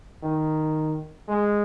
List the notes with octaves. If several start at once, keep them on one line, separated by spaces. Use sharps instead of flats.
D#3
G#3